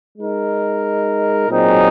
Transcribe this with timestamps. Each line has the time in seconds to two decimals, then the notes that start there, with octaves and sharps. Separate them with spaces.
0.17 G#3 D#4 A#4
1.47 A#2 F#3 C4 D#4 G#4